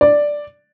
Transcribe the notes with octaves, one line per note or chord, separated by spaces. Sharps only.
D5